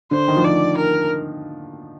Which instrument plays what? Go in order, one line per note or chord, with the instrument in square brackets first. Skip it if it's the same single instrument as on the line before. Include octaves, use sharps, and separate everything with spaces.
[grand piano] D3 [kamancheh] C5
[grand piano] D#3
F3
[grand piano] D#3 [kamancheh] D5
[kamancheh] A#4